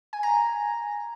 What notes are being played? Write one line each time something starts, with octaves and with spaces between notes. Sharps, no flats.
G#5
A#5